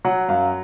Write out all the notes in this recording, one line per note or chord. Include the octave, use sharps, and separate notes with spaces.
F#3 F#5
F#2 F5